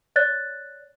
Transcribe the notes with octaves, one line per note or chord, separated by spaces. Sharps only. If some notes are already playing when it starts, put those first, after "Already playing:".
C#5 D5 F#6 A6